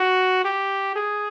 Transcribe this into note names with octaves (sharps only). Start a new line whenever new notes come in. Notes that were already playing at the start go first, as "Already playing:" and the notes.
Already playing: F#4
G4
G#4